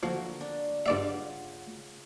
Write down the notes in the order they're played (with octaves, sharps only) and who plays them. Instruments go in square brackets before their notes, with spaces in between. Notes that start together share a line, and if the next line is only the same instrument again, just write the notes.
[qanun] D3 A#3 F#4 [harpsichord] F3
[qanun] D4 [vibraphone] D5
[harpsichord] G2 D5 E5 [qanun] C#3 F4 [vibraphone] F#5